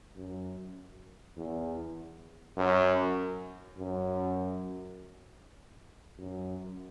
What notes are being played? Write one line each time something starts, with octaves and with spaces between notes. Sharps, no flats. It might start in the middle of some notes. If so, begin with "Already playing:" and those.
F#2
E2
F#2
F#2
F#2